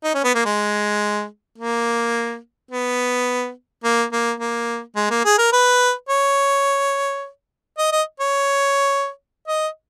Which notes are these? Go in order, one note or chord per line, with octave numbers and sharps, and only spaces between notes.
D#4
C#4
B3
A#3
G#3
A#3
B3
A#3
A#3
A#3
G#3
A#3
G#4
A#4
B4
C#5
D#5
D#5
C#5
D#5